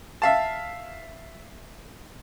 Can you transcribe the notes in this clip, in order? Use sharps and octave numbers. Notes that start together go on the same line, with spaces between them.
E5 F5 A5